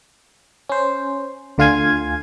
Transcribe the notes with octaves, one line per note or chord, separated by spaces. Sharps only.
C#4 C5
D2 D3 F4 F5 G#5 G#6